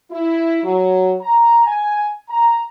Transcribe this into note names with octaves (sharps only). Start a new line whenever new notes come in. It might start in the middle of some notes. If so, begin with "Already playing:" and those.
E4
F#3
A#5
G#5
A#5